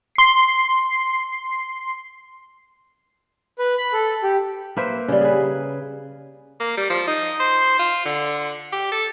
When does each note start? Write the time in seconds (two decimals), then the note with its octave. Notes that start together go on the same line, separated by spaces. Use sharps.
0.15 C6 C7
3.59 B4
3.78 B5
3.93 A4
4.23 G4
4.77 A#3 B4 C5 E5
5.08 C#3 G3
5.21 G#4 B4
6.60 A#3
6.77 G3
6.90 F3
7.07 D#4
7.40 C5
7.79 F4
8.05 D3
8.72 G4
8.91 A4